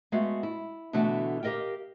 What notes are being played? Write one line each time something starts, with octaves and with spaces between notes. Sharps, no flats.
G#3 A3 B3 F#4 F5
E4
B2 D3 E3 A3 F#4
G4 A#4 D#5 F5 G5